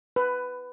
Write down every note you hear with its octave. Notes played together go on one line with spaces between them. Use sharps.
B4